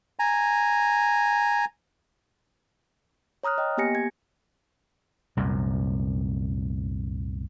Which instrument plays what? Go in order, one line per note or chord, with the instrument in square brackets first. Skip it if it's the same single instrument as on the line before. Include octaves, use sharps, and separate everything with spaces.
[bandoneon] G#5 A#5
[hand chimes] C#5 A#5 D#6 F6 F#6
D#5 G5
A#3 B3 G4 G#5 A#6 C#7
G#6
[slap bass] C2 F#2 A#2